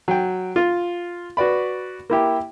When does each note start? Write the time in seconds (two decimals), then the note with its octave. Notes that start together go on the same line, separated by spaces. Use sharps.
0.08 F#3 G5
0.56 F4
1.37 F#4 B4 D5 B5
2.10 A#3 E4 G4